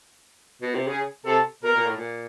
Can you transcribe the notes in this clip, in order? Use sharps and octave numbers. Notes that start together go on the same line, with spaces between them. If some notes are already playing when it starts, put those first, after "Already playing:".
B2
C3
C#3 G#4
C3 A4
B2 A#4
A#2
A2
A#2